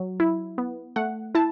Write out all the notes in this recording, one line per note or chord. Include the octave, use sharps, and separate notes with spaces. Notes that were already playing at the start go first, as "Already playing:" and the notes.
Already playing: F#3
E4
B3
A3 F#5
E4 A5